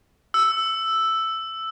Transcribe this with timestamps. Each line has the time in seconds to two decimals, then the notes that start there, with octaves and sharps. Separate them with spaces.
0.34 E6